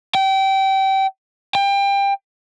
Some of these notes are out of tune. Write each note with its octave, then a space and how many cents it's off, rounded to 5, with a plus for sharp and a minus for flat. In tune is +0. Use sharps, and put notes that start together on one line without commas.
G5 -25
G5 +25